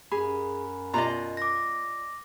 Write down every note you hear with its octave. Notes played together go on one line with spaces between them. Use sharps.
F#2 G#4 B5
B2 F4 D5 D#5 A#5
D6 A#6